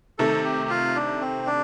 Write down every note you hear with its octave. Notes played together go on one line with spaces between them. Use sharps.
C3 D#3 A3 A4
G4
F4
D4
C4
D4